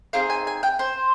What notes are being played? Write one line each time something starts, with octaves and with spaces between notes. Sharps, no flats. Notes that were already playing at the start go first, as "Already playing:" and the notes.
C4 D#4 G#4 F5
G#5
G#5
G5
C5